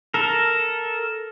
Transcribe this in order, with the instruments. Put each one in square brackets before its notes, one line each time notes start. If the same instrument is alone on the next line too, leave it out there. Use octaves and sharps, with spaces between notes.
[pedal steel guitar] A4 A#4